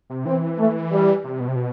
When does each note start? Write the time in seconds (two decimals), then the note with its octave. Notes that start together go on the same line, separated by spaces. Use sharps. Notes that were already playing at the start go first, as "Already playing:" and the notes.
0.10 C3
0.25 E3 C4
0.58 A3
0.91 G3
1.24 C3
1.40 B2
1.48 C3
1.56 B2